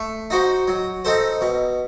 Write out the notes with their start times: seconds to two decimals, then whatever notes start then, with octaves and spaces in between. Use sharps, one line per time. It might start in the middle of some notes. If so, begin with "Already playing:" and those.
Already playing: A3
0.30 D#4 F#4 C5
0.68 F#3
1.05 C4 D#4 A4 C5
1.41 B2